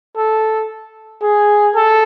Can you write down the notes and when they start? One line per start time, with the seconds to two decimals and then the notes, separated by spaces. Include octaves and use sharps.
0.17 A4
1.22 G#4
1.75 A4